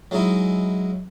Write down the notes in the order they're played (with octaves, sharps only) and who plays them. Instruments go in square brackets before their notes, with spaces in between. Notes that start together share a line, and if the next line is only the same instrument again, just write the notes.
[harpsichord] F#3 G#3 C#4 D#4 E4